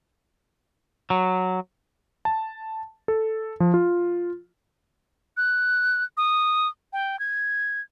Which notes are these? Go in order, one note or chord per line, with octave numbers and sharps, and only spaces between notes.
F#3
A5
A4
F3
F4
F#6
D#6
G5
G#6